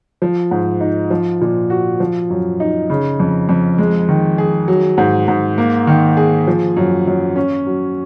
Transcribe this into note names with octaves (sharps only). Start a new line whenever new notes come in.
F3
G#2
D#4
F3
A#2
F#4
F3
F#2
D#4
C#3
F2
F2
G#3
D#3
G#4
F#3
G#2
G#2
A#3
D#3
G#4
F3
F#2
F#2
C#4
F#3